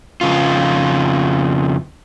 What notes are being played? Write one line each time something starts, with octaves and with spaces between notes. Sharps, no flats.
F2 C#3 F4